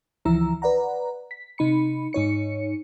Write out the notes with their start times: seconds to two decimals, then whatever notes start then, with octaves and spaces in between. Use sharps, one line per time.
0.25 C#2 E3 F3 E4 A#5 E6
0.62 B4 D5 F#5 A#5
1.31 B6
1.58 C3 D#4 B5 C#7
2.13 G#2 D#4 C#5 C#7